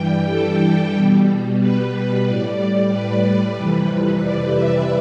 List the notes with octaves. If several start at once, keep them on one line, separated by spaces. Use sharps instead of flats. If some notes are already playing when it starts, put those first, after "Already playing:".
Already playing: G2 E3 G3 G5
A4
B2 G3
B4
A2 G3 D5
D5
B4
F2 C3 E3 G3 B4
D5
E5